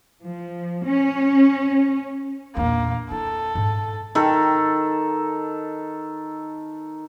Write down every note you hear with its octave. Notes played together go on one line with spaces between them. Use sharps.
F3
C#4
A#1 E2 A#3
E4 A4
G#2
D#3 A4